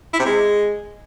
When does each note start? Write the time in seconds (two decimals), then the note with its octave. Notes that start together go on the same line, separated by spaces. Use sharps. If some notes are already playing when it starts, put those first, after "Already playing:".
0.13 E4
0.19 C3
0.25 G#3